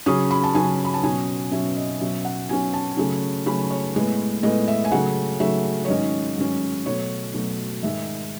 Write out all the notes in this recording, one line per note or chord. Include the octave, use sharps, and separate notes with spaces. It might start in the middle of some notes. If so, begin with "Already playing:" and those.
C#3 F#3 C#4 D#6
B5
A5
C#3 F#3 C#4 G#5
B5
A5
B2 F#3 C#4 G#5
B2 F#3 C#4 E5
D#5
B2 F#3 C#4 E5
F#5
B2 F#3 C#4 G#5
A5
C#3 F#3 A3 C#4
C#3 F#3 A3 C#4 B5
C#5
A2 G#3 B3
A2 G#3 B3 D#5
E5
G#5
C#3 F#3 A3 F#5
C#3 F#3 A3 E5
C#5
G#2 D#3 F#3 C#4 D#5
G#2 D#3 F#3 C#4
B2 F#3 A3 C#5
B2 F#3 A3
G#2 D#3 G#3 E5